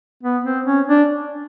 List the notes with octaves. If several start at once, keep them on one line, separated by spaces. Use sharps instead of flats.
B3
C4
C#4
D4